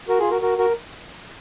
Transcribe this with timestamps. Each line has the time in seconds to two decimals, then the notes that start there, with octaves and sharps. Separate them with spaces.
0.08 F#4 A#4
0.20 F4 G#4
0.31 F#4 A#4
0.41 F#4 A#4
0.58 F#4 A#4